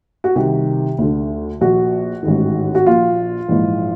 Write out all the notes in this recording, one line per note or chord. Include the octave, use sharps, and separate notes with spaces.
F#4
C2 C3 D#3 G4
D2 D3
A#1 A#2 F#4
A1 G#2 D#3
F#4
A#1 A#2 F4
A#1 G#2 E3